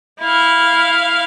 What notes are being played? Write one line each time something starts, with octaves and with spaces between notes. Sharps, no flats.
E4 F5